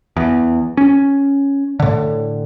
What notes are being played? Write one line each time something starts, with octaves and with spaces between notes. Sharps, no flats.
E2
C#4
A2 D3